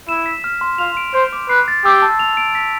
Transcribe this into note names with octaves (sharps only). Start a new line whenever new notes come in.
E4 E7
B6
F6
C6
F4 F7
D7
C5 G6
D6
B4 C7
A6
G4 E6
A5
F7
D7
B6